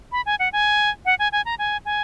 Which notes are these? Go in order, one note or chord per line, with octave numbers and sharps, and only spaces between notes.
B5
G#5
F#5
G#5
F#5
G#5
G#5
A#5
G#5
G#5